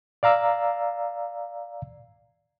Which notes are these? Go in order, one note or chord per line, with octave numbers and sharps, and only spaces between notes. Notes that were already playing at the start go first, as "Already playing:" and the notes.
D5 F5 A#5 E6